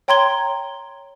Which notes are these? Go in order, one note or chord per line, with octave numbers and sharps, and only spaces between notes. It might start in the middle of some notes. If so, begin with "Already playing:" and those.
C#5 G5 A#5 C6 G#6 G7